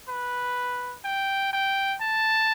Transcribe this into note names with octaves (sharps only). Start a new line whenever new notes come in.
B4
G5
G5
A5